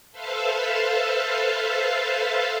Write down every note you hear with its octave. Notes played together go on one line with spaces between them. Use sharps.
A4 B4 C5 E5 F5 A5